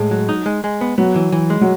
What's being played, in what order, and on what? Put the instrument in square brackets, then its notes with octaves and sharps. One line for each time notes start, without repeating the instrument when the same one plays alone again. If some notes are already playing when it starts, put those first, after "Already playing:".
Already playing: [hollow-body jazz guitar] A2 [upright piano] G#3
[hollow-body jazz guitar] F#3
D#4
G#3
G#3
B3
[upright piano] F#3 [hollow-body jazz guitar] B3
[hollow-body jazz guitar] E3
E3
G#3
[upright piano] F#3